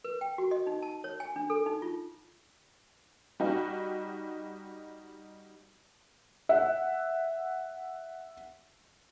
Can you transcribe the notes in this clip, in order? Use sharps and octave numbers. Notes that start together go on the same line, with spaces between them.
B4
G5
F#4
D#5
D#4
A5
C#5
G#5
D4
A4
D#4
F4
G3 D#4 F#4
E5 F#5